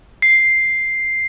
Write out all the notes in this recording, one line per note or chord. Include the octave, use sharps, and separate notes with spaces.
C7